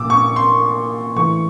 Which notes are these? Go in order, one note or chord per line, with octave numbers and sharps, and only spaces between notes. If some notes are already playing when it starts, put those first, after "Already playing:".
Already playing: A#2 D6 E6
C#6
C6
A2 E3 C#6